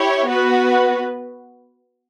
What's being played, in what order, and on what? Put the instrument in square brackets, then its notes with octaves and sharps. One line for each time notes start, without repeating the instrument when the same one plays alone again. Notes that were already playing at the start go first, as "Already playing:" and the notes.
Already playing: [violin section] E4 G4 C#5
B3 F#4 B4